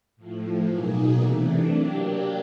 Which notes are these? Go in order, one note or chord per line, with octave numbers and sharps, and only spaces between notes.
A2 F3 A3
B2 F#3 A#3 D#4 G#4
C3 E3 A3 D4
F#3 A#3 D4 G4